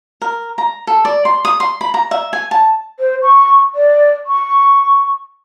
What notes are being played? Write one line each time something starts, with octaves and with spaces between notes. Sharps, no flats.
A#4
A#5
A4
D5
C6
D#6
C6
B5
A#5
E5
G#5
A5
C5
C#6
D5
C#6